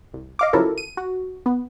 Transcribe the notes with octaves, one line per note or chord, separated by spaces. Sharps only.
C2
D#5 F5 D6
C#3 F3 F#3 E4 A4 A#4
D#7
F#4
B3